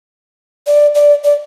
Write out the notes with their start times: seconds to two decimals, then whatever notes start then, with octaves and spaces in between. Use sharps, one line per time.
0.67 D5
0.95 D5
1.24 D5